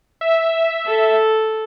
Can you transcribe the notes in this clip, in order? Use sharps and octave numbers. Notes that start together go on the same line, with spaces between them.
E5
A4